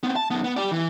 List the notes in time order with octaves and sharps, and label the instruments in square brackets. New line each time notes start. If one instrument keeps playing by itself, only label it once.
[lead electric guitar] B3 C4
A5
F#2 B3
B3
G4 D5
E3